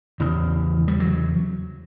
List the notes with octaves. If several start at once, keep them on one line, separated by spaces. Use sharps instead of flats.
E2 C#3 E3
G3
F#3